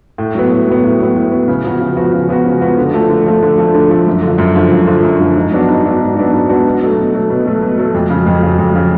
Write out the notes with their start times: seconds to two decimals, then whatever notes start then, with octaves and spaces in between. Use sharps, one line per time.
0.18 A2
0.35 F#3 B3
0.51 A2
0.68 F#3 B3
0.84 A2
0.99 F#3 B3
1.16 A2
1.32 F#3 B3
1.48 C#3
1.64 F3 B3 F#4
1.80 C#3
1.97 F3 B3 F#4
2.13 C#3
2.29 F3 B3 F#4
2.45 C#3
2.61 F3 B3 F#4
2.78 D3
2.94 F3 A3
3.10 D3
3.26 F3 A3
3.43 D3
3.58 F3 A3
3.74 D3
3.90 F3 A3
4.07 F#2
4.23 D3 F3
4.38 F#2
4.56 D3 F3
4.71 F#2
4.87 D3 F3
5.03 F#2
5.19 D3 F3
5.36 G#2
5.52 F#3 B3 D4 F#4
5.68 G#2
5.84 F#3 B3 D4 F#4
6.01 G#2
6.16 F#3 B3 D4 F#4
6.33 G#2
6.49 F#3 B3 D4 F#4
6.65 B2
6.81 F#3 A3
6.97 B2
7.13 F#3 A3
7.30 B2
7.46 F#3 A3
7.62 B2
7.78 F#3 A3
7.95 F2
8.10 C#3 F#3
8.27 F2
8.42 C#3 F#3
8.59 F2
8.75 C#3 F#3